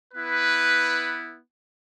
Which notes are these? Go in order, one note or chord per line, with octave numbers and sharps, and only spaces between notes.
B3 E4 B4